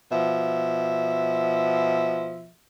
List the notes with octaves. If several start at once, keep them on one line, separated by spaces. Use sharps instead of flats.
B2 F3 E5